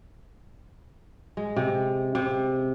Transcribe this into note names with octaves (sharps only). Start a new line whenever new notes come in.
G#3
C3
C3